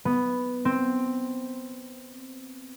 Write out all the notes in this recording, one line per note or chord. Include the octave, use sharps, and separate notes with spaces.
B3
C4